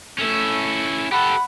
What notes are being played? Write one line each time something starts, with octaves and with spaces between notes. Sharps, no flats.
A3 C#4 E4 A4
G4 A4 F#5 B5